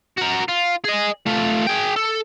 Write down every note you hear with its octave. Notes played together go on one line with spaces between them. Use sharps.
F#4 A#4
F4
G#4 D#5
A3 F4
G#4 G5
A4